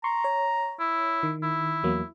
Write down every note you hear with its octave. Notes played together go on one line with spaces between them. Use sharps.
A#5 C6 C#6
C#5
E4
D#3
E4
E2 F#3 A#3